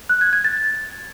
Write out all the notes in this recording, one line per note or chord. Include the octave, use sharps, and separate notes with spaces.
F#6
G#6
G#6
A6